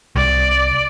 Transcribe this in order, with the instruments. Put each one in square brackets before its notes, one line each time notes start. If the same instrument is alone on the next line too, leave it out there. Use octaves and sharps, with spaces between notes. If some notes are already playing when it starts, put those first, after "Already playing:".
[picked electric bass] C2 [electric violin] D5